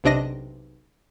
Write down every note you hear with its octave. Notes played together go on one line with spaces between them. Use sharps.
B1 C3 D4 D#5 A#6